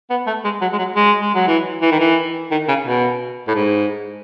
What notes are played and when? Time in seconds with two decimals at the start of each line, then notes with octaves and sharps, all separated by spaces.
0.10 B3
0.27 A3
0.44 G#3
0.62 F#3
0.73 G#3
0.79 F#3
0.96 G#3
1.21 G#3
1.35 F#3
1.47 E3
1.82 E3
1.92 D#3
2.00 E3
2.51 D#3
2.68 C#3
2.85 B2
3.48 A2
3.55 G#2